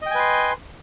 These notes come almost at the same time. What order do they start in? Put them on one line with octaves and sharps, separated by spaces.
D#5 G5 G#5 B4 C6